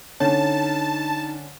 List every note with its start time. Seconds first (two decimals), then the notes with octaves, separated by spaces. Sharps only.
0.20 D3 C#4 D#4 C#5 A5